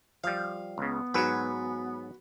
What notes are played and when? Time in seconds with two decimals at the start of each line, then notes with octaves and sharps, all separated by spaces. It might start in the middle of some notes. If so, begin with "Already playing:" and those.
0.24 F3 G3 F5
0.78 C#2 C#3 B3
1.14 G#2 F#3 F#4 B4